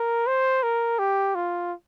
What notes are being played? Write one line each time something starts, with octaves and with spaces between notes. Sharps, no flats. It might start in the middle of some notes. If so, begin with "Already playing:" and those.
Already playing: A#4
C5
A#4
G4
F4